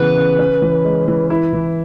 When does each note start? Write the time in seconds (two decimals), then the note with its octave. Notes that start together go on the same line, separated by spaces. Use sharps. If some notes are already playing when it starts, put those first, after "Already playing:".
Already playing: C#3 E3 B3 B4
0.17 C#3
0.39 C#4
0.62 E3
0.84 G#3
1.08 E3
1.30 E4
1.53 E3